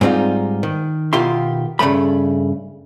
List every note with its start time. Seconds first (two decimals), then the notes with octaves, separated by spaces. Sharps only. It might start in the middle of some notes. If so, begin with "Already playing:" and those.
0.01 G#2 G3 C4 D#4 F4
0.63 D#3
1.13 B2 D#3 F4 G4 E5 C6
1.79 G2 C#3 G#3 A3 B5